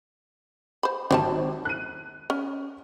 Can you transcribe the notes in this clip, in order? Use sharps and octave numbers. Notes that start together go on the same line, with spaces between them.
C5 B5
G#1 F#3 G3 C5 A5
F#6 D#7
C#4